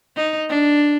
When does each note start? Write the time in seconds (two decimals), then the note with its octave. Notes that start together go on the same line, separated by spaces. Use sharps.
0.16 D#4
0.49 D4